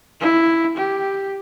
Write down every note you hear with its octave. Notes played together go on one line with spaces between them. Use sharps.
E4
G4